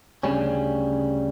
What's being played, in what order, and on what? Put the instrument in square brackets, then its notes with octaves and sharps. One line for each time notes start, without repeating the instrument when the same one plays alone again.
[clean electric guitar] D2 C#3 G3 C#4